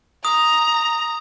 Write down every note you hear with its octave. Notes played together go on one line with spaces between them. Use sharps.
A#5 D#6